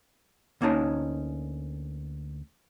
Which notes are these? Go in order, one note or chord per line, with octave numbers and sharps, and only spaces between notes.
D2 A#3 C#4 D#4 A5